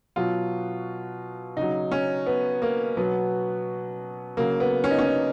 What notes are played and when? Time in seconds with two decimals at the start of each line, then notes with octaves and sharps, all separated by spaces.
0.16 B2 F#3 F4
1.57 C#3 F#3 D#4
1.91 C#4
2.26 B3
2.62 A#3
2.97 B2 F#3 B3
4.37 C#3 F#3 A#3
4.60 B3
4.84 C#4
4.91 D#4
4.99 C#4
5.07 D#4